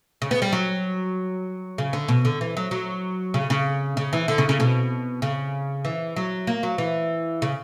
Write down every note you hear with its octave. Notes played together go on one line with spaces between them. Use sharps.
C#3
B3
G3
F#3
C#3
D3
B2
D3
E3
F#3
F#3
C#3
C#3
C#3
E3
D3
C#3
C#3
B2
C#3
E3
F#3
A#3
F#3
E3
C#3